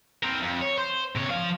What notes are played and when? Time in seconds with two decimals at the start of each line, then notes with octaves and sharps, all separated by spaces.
0.23 C4 A#4
0.43 F2
0.62 C#5
0.78 C5
1.16 C3 C#5
1.30 F3 F5